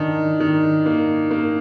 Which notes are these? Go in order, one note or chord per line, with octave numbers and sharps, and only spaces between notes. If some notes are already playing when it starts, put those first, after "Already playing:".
Already playing: D#3 D4
D#3
A#3
A#3